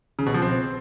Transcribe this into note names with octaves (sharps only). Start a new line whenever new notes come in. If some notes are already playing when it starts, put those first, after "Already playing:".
C#3
B2
F3
C4